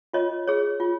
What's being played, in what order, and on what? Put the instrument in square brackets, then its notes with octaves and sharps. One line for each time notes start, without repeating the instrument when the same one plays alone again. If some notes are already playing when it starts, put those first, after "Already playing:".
[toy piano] F4 C#5 D#5
G#4 C#5
F4